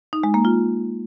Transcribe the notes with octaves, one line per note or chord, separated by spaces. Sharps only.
D#4
G#3
A#3
F4